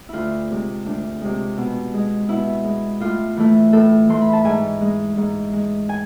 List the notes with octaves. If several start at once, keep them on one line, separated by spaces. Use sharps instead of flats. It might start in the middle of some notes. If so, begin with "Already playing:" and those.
D2 E4 F4
C3 G#3
D2 D4
C3 G#3
B2
G#3
B2 E4
G#3
A2 F4
E3 A3
A2 A4
E3 A3 C6
B5
A5
G#2 G#5
G#3
G#2
G#3
G#5